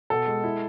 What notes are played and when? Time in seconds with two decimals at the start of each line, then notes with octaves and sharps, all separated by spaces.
0.10 B2 A4
0.27 G#3
0.44 E4